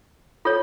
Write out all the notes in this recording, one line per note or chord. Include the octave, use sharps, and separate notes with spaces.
F4 A4 C#5